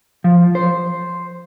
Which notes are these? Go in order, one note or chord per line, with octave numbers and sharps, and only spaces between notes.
F3
C5